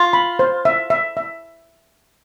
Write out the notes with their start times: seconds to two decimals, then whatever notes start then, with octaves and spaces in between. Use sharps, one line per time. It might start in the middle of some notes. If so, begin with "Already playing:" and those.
Already playing: F4
0.13 B5
0.39 C5
0.65 E5
0.90 E5
1.17 E5